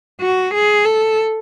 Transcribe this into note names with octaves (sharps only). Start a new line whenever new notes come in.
F#4
G#4
A4